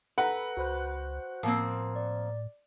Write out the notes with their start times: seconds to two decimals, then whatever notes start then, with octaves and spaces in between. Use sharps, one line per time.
0.18 A4 B4 F#5 A#5
0.57 C#2 F#4 C5 F#6
1.43 A2 F3 A#3 C4 A#4
1.96 D5